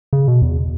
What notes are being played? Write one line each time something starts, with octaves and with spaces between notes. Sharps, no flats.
C#3
B2
E2